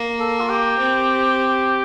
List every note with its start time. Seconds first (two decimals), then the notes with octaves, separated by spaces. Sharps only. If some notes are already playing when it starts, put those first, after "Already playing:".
Already playing: A#3
0.19 A4
0.40 F4
0.49 G4
0.78 C4